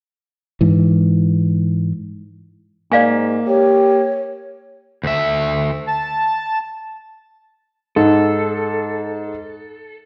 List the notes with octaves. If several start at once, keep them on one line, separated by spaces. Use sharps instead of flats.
G#2 E3
G#2 A#3 D5 F5 G#5
G4 C#5
D2 E5
A5
G#2 A4